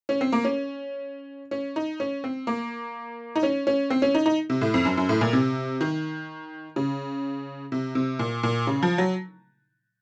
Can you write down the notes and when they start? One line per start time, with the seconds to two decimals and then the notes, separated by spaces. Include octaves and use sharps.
0.09 C#4
0.21 C4
0.32 A#3
0.45 C#4
1.51 C#4
1.76 D#4
2.00 C#4
2.24 C4
2.47 A#3
3.36 D#4
3.43 C#4
3.67 C#4
3.90 C4
4.02 C#4
4.15 D#4
4.26 D#4
4.50 C3
4.61 A2
4.74 F2
4.85 F#2
4.97 F#2
5.09 A2
5.21 A#2
5.33 C3
5.81 D#3
6.76 C#3
7.72 C3
7.95 C3
8.19 A#2
8.43 A#2
8.67 C#3
8.83 F3
8.98 F#3